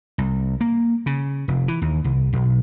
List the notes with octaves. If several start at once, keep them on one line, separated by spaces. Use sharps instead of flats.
C2
A#3
C#3
F1
E3
D#2
C2
B1